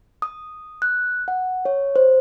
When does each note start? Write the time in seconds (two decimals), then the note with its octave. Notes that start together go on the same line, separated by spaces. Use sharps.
0.22 D#6
0.82 F#6
1.28 F#5
1.65 C#5
1.96 C5